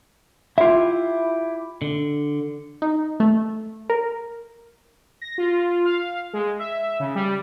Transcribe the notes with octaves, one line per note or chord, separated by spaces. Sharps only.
E4 F4 G4 E5
D3
D#4
A3
A#4
A#6
F4
F5
G#3
E5
C#3
G3